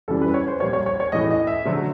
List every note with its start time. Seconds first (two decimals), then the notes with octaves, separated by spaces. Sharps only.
0.08 F#2 C#3 E3 G3 A4
0.22 B4
0.34 C#5
0.48 C5
0.60 A#2 G3 A#3 C#5
0.73 C#5
0.86 C#5
1.00 C#5
1.12 A2 E3 A3 D#5
1.31 D#5
1.47 E5
1.65 D3 F#3 A3